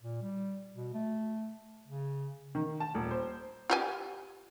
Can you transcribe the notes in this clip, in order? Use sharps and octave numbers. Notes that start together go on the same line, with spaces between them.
A#2
G3
B2
A3
C#3
D#3
A5
D#1
C5
F4 G4 G#5